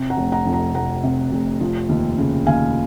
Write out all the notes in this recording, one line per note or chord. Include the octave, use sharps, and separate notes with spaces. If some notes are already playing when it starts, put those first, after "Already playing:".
Already playing: C3
F#5 A#5
F1
F#5 A#5
F2
F#5 A#5
F1 F#5 A#5
C3
F1
F3
D#2
C#3
D#2 F5 G#5